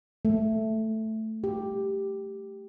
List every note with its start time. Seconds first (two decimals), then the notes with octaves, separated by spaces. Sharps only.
0.25 A3
1.44 G4